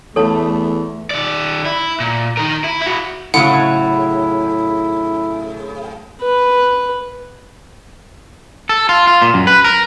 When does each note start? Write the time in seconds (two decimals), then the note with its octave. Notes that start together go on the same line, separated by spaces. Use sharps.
0.16 E2 A3 A4 C#5 A5
1.11 D#3 D5
1.65 E4
2.00 A#2
2.37 D#3 A#4
2.64 E4
2.82 E4 F#4
3.34 A2 C#3 F#3 E4 F#5
6.21 B4
8.69 A4
8.89 F4
9.07 F4
9.22 A#2
9.34 F#2
9.47 B4
9.64 A#4